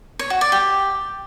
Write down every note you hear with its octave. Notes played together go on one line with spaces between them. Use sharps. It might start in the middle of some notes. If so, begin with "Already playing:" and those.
C#5
F#4
D5
G4